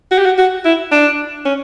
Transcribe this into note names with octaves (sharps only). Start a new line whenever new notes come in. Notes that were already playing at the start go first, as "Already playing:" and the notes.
F#4
G4
F#4
F#4
E4
D4
C#4